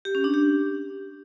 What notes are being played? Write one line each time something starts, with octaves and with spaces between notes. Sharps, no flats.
G4
C#4
D4
G4